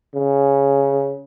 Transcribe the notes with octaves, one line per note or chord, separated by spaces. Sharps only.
C#3